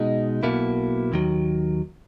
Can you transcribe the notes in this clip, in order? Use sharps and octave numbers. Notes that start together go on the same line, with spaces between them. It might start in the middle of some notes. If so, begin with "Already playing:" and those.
Already playing: B2 G#3 D#4
B1 B2 A#3 E4
D#2 D#3 F#3